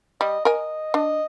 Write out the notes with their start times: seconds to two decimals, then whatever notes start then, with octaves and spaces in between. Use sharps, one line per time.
0.21 G3 D#5
0.45 A#4 D#5 G#5
0.94 D4 D#5